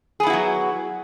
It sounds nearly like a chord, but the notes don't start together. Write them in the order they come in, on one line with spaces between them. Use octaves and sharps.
G#4 B3 E4 F#4 F#3